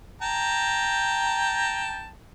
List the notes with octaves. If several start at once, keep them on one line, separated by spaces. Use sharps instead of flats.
G5 A5 A#5